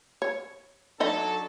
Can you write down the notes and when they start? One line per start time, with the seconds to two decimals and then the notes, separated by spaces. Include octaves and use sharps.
0.22 C#5
1.00 F#3 D4 D#4 A4 D#5 E5